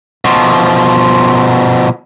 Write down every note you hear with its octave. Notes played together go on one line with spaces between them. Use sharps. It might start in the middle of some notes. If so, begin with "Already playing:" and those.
B2 F3